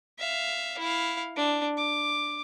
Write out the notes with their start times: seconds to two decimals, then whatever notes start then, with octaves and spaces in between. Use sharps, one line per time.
0.19 E5 F5
0.79 E4 F5
1.37 D4
1.77 D6